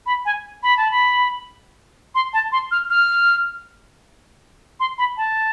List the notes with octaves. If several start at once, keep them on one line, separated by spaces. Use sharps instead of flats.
B5
G#5
B5
A5
B5
C6
A5
C6
F6
F6
C6
B5
A5